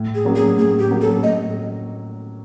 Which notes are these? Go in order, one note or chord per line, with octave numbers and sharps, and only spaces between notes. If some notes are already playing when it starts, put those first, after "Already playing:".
Already playing: A2
G#4
F#3 A#3 C#4
G#4
A2 G#4
G4
F#3 A#3 C#4
A4
A2 D#5